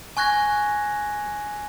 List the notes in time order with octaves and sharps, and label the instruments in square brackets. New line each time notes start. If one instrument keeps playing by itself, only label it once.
[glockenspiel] G#5 C#6 F#6 G#6 A#6